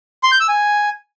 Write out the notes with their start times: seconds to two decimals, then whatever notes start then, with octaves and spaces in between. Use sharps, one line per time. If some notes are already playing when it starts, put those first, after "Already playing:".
0.23 C6
0.32 G6
0.40 E6
0.49 G#5